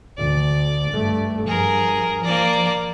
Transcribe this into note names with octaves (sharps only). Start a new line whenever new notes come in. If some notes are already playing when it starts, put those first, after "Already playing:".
D2 D5
G2 A3
G2 F3 G#4 A#4
F3 A#3 D5